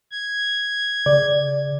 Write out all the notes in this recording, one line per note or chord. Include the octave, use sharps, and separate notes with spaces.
G#6
C#3 D5